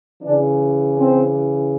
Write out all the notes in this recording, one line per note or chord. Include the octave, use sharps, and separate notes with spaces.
C#3 E3 D4
C4